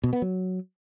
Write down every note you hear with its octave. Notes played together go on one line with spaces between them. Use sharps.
B2
B3
F#3